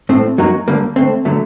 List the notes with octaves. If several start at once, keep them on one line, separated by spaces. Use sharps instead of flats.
A2 A3 C4
F#2 F#3 A#3 D#4 F#4
D#2 D3 G3 A#3
D3 A3 C4
D3 F#3 A3